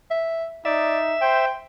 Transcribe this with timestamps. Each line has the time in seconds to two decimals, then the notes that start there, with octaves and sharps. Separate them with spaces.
0.11 E5
0.65 D#4 D5 E5
1.21 C5 G5